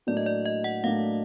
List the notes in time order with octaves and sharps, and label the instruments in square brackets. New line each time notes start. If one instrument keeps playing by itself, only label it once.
[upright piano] A2 F#3 A#3 D4 [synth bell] D5
[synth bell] D#5
D5
D#5
F#5
[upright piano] A2 F#3 A#3 D4 [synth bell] F5